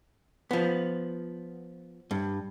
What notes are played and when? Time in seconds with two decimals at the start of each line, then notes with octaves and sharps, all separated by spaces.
0.51 F3 B3
2.11 G2